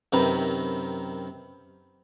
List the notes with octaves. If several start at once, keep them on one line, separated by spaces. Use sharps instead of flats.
F#2 C3 D#3 B4 A#5 B5